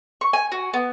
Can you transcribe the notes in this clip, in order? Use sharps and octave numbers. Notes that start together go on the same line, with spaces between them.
C#6
G#5
F#4
B3